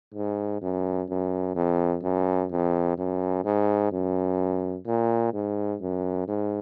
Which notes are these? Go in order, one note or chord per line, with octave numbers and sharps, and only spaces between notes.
G#2
F#2
F#2
F2
F#2
F2
F#2
G#2
F#2
A#2
G#2
F#2
G#2